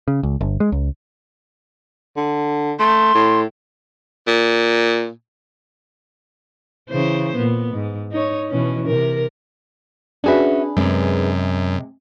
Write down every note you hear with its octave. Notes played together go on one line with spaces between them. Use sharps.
C#3
C#2
G1
G#3
C#2
D3
A3 C6
A2
A#2
C#3 E3 C5
A#2 B3
G#2
D#4 C#5
B2 E3 C#4
C3 A#4
C#4 D4 F#4 G#4 B4 E5
F#2 C3 G#3